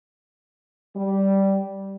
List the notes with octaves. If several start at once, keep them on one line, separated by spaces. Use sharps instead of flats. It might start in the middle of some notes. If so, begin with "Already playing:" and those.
G3